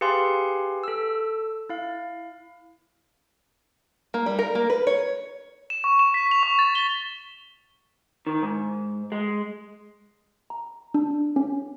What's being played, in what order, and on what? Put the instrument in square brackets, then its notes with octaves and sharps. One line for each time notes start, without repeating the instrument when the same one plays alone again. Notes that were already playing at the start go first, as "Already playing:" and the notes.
[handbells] G4 G#4 B4 F5 G#5 C6
A4 E6
E4 F5
[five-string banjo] A#3
G3
A#4
A#3
B4
C#5
[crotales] E7
C#6
E7
B6
F7
C#6
A6
G7
[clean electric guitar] D#3
G#2
G#3
[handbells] A#5
D4
C#4